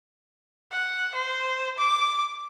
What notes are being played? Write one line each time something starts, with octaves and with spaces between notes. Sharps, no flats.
F#5
C5
D6